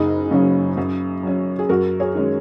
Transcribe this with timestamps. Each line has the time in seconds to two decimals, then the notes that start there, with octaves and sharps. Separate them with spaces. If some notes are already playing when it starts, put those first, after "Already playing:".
Already playing: F#1 D#4 G#4
0.31 F#2 C#3 F#3 C#4
0.77 F#2
1.23 F#3 C#4
1.59 G#4
1.69 F#2 F#4 A#4
2.00 G#4 C#5
2.15 D#3 G#3 C#4